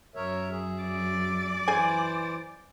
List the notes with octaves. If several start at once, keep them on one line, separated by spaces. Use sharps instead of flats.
F#2 A#4 C#5 E5
G#4 E5
D5
E3 G#4 C5 G#5